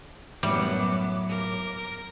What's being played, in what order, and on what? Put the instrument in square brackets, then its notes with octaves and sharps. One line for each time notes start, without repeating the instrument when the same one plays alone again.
[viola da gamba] F#2 B3 [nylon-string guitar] A2 F#3 [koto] G3 [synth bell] D6
[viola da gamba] A#4